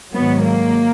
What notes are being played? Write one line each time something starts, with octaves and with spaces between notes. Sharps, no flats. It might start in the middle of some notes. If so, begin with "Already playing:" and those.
G#2 D#3 F#3 B3
A#3